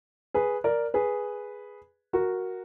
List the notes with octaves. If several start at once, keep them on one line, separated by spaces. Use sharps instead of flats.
G#4 B4
A#4 D5
G#4 B4
F#4 A#4